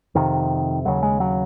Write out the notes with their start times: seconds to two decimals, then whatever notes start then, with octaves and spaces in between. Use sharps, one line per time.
0.15 F2 C3 D#3
0.85 D#2 C#3 F#3
1.03 G#3
1.20 F#3